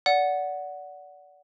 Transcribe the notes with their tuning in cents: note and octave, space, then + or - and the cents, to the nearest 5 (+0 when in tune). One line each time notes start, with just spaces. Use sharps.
D5 -25 F#5 +0